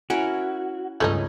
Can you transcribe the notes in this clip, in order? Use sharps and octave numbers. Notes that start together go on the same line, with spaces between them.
C#4 E4 F#4 A#4
C#2 G2 A3 C#4 D#4